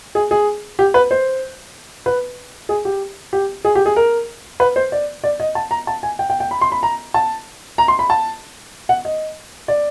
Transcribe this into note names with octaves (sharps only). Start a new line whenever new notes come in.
G#4
G#4
G4
B4
C5
B4
G#4
G4
G4
G#4
G4
G#4
A#4
B4
C5
D5
D5
D#5
A5
A#5
A5
G#5
G5
G5
G5
B5
C6
B5
A#5
A5
A#5
C6
B5
A5
F#5
D#5
D5